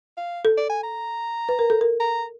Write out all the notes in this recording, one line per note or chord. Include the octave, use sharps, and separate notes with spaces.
F5
A4
D5
G#5
A#5
B4
A#4
A4
A#4
A#5